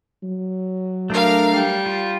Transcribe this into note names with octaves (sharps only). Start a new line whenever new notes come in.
F#3
A3 D4 A#4 F5
G3
F4